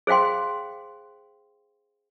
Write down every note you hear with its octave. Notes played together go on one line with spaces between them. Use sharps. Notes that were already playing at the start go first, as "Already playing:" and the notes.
G#4 C5 F5 G5 C6